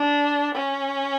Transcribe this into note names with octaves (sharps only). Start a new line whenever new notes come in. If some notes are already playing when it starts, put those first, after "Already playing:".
Already playing: D4
C#4